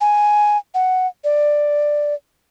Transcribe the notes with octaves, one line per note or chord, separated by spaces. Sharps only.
G#5
F#5
D5